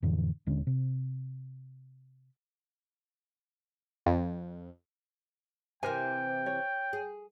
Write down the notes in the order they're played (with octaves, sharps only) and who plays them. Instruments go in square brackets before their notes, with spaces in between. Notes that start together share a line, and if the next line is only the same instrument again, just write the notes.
[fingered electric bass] F2 A2 D3 E3
D#1 D3 G#3 C#4
C3
[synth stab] F2
[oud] C3 E3 [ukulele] A#4 C5 G#5 [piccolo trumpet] G5
[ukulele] C#5
[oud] G#4